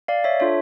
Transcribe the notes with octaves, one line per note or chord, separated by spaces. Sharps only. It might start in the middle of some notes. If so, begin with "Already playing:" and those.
D5 F5
C#5 E5
D4 F4 A4 C#5